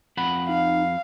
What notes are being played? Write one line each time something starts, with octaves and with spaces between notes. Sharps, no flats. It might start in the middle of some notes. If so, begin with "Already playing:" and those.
F2 F#5 B5
D#4 F5